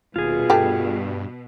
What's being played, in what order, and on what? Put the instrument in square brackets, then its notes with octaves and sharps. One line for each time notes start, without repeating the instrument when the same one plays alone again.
[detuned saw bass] D#1 [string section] B2 [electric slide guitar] F4 G#4
[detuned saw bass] G2 [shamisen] G3 A3 G4